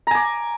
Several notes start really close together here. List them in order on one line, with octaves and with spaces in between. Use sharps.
A#5 G#5 D6